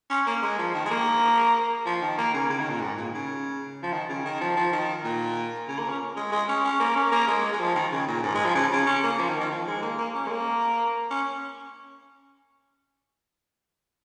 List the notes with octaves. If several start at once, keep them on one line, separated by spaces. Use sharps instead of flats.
C#4
A#3
G#3
F3
D#3
G#3
A#3
F3
D#3
A#3
C#3
C#3
D#3
A#2
G#2
A#2
C#3
F3
D#3
C#3
D#3
F3
F3
D#3
A#2
C#3
A#3
C#4
G#3
G#3
C#4
C#4
A#3
C#4
A#3
G#3
G#3
F3
D#3
C#3
A#2
G#2
G#3
F3
C#3
C#3
C#4
A#3
F3
D#3
D#3
F3
G#3
A#3
A#3
C#4
G#3
A#3
C#4